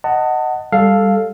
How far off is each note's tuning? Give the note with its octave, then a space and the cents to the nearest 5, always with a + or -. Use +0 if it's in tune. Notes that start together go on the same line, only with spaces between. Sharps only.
D#5 +0 F#5 +10 A5 +20
G3 +20 A4 +0 F5 +0